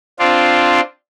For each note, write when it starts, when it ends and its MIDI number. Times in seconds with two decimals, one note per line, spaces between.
0.19 0.81 60
0.19 0.81 62
0.19 0.81 65